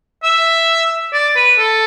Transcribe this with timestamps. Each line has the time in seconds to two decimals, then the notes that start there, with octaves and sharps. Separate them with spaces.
0.23 E5
1.13 D5
1.36 B4
1.58 A4